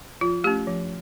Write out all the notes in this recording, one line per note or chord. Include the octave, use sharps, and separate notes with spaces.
F3 F4
A3 C#4 G4
F3